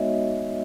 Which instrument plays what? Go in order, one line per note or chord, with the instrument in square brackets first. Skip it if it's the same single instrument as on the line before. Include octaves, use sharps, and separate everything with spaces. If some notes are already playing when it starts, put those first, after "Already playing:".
Already playing: [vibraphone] G#3 B3 D#4 F#4 C#5 D#5 E5